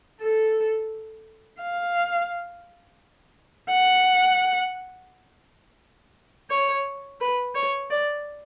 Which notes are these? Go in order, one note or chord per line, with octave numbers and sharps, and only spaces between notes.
A4
F5
F#5
C#5
B4
C#5
D5